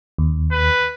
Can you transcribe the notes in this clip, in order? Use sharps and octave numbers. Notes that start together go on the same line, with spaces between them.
D#2
B4